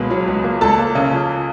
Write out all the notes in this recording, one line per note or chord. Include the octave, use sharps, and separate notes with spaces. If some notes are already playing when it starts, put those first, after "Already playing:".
Already playing: C#2 B2 G#3 A#3 B4
F#3
C#2
A#3
C#2 A4 A5
A#3
C#3
F3